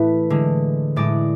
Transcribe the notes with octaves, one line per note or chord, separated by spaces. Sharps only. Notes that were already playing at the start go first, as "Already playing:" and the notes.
Already playing: A2 E3 A3 B4
D3 G#3
A2 G#3 D5